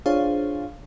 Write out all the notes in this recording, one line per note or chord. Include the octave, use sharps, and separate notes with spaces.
D4 F4 G#4 C5 C#5 F5